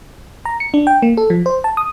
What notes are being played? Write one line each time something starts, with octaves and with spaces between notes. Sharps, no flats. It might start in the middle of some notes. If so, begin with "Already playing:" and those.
A#5
C#7
D4
G5
A#3
A4
F3
C5
A5
D#6